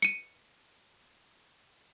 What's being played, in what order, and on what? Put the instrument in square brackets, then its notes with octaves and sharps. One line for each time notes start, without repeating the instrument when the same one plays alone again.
[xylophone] C#7 D#7